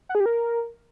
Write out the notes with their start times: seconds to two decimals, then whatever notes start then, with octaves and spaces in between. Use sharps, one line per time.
0.09 F#5
0.15 G#4
0.20 G4
0.26 A#4